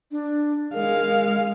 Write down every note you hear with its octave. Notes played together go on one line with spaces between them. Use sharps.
D4
G#3 A#4 F5